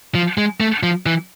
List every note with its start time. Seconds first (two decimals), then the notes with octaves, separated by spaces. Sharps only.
0.15 F3
0.38 G#3
0.60 A3
0.83 F3
1.06 E3